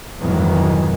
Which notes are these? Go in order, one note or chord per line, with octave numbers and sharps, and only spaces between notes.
F2 G#2 B2 D#3 E3 F#3